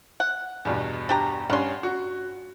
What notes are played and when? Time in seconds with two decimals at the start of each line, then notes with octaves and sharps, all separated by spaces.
0.20 F#5
0.65 E2 G2 B2
1.09 D4 G4 A#5
1.50 G2 C#4 F#5 C6
1.83 F#4